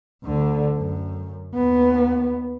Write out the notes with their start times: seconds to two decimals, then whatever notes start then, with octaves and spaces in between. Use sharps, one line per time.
0.24 D2 D3
0.77 F#2
1.55 D#2 B3